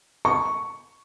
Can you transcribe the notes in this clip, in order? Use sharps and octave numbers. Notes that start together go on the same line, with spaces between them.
C#6